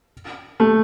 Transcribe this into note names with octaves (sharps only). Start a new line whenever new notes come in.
A3